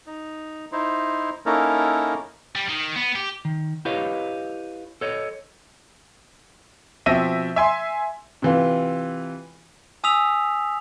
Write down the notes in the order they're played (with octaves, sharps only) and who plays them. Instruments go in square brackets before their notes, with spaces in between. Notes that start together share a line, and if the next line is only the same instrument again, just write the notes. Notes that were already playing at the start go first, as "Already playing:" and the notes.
[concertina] D#4
D#4 E4 C5
A#3 C#4 D#4 E4 A4 A#4
[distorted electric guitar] G3
D#3
B3
G4
[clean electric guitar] D#3
E4 G4 B4 C#5 D#5 F5
A4 C#5 D#5
[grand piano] B2 F3 C4 E5 A#6 D#7
E5 G#5 C6
[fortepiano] C3 E3 F4
[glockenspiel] G#5 D#6 E6 B6 F7